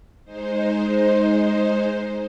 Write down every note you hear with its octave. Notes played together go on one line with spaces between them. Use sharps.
G#3 D#4 C5